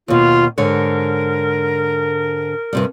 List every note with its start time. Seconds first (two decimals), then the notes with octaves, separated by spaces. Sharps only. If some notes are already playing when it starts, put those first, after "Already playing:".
0.08 D#2 B2 F4
0.58 G#2 D3 A#4 C#5
2.73 G2 C3 G3